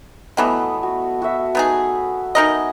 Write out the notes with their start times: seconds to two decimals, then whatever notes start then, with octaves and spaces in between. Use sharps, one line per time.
0.37 E3 F#3 G3 A3 B3 D#5
0.83 F#4
1.22 F#4 E5
1.55 B3 D#4 G#4
2.35 D#4 A#4 D#5 E5 F#5 G#5